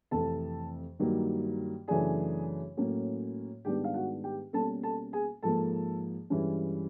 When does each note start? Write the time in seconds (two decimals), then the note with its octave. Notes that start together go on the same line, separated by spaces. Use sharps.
0.11 F2 C3 E3 A3 A4 A5
1.00 G2 D#3 F#3 A#3
1.88 F#2 C#3 E3 A3 D4 G#4 G#5
2.77 A2 F#3 A#3 C#4
3.65 G#2 D#3 G3 B3 D4 G4 G5
3.84 F5
3.94 F#4 F#5
4.24 G4 G5
4.53 B2 G3 A#3 C#4 A4 A5
4.83 A4 A5
5.13 G#4 G#5
5.43 G#2 F3 A#3 A4 A5
6.30 G2 E3 G#3 C#4